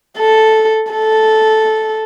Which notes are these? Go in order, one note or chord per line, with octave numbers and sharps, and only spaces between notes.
A4
A4